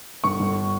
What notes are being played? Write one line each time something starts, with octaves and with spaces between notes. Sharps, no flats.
G1 C#6
G1